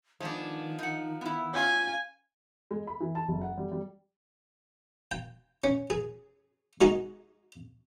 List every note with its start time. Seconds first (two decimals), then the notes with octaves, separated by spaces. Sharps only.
0.20 D#3 F3 G#3 B3 D4
0.78 D#4 F#5
1.21 B3 E4
1.54 C#4 F4 G#5
2.71 G#3
2.87 B5
3.01 E3
3.15 A5
3.28 F#1
3.41 F#5
3.57 G3
3.71 G3
5.11 G5
5.64 C#4
5.90 G#4
6.81 G#3 D#4 F#4 G#4 D#5